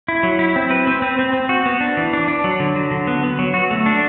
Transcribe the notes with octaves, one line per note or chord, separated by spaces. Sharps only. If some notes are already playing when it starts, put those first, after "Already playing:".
E4
F#3
E4
C4
B4
C4
C4
C4
C4
F#4
B3
D4
E3
D4
D4
F#3
D3
F#3
D3
B3
B3
F#3
F#4
A3
D4